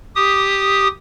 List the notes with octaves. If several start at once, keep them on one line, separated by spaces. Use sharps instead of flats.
G4 D#6